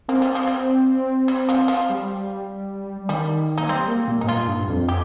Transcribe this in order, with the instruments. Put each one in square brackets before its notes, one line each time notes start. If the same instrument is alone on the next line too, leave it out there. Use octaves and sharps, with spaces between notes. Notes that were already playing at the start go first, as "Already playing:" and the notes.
[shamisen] A#3 [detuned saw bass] C4
[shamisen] G3
F3
G3
G3
F3
F3
[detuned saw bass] G3
[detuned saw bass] D#3 [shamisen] G3
[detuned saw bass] A#3 [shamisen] D#4
[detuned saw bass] G3 [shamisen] C4
[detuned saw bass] A#3
A#2
[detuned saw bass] G2 [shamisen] D#4
[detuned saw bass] A#2 [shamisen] F4
[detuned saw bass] G2
F2
[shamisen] G4